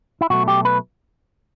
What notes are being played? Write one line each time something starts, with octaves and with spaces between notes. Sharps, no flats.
E4
B2 F#3 A3 F#4
G4
B4